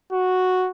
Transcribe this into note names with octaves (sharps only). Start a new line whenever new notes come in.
F#4